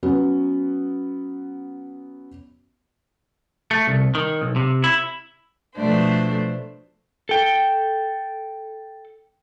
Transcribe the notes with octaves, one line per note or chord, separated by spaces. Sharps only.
F#3 B3 C#4
A3
C2
D#3
B1
C3
E4
B2 F3 A3 B3 D4 C5
A4 G5